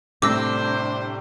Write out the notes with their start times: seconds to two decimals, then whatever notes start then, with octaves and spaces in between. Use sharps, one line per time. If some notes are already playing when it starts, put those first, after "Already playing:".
0.22 A2 C3 G3 D4 C5 D6 E6 A#6